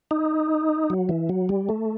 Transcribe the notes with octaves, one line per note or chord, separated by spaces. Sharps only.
D#4
F#3
E3
F#3
G3
A3